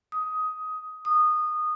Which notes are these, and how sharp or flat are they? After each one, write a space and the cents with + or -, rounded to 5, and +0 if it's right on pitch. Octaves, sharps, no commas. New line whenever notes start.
D#6 +15
D#6 -20